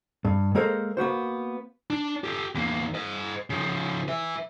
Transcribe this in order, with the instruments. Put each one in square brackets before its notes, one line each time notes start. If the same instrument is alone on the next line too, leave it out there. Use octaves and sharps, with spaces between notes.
[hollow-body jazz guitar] G2
G#3 A#3 A4 A#4 C5
A#3 B3 F#4 C5
[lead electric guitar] D4
G4 A4
E2 A#3
C5 D#5
C#3 F3
B4 E5